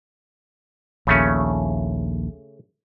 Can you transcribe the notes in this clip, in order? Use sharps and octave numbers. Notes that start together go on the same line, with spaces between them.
A#1 D#2 C#3 A3 C#4